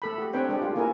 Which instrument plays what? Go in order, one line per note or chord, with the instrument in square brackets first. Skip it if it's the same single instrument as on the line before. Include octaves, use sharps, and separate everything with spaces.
[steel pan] A3 A4 B5
F#4 G4
C4 D4 B4 C#5 G5
G#3 D4 G4
A3 F4
A#3 C#4 E4 A4 A#4 G#5